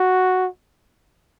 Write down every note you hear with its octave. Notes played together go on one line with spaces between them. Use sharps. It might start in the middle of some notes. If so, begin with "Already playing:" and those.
Already playing: F#4